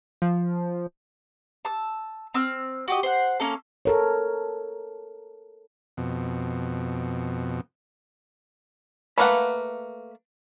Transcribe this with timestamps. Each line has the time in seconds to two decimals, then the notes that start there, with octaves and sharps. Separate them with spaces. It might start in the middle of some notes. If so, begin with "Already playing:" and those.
0.22 F3
1.65 A5 E6
2.34 C4 E6 F6
2.88 F#4 G4 D#5
3.03 C5 F#5
3.40 A#3 C#4 A4
3.85 A4 A#4 C#5
5.97 F2 B2
9.18 A3 A#3 B4 F5 F#5 B5